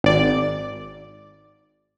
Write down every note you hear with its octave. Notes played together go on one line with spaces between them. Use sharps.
G#1 D5